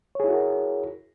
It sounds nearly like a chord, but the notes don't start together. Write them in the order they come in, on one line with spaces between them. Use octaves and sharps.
C#5 G#4 E4 F#4 A#4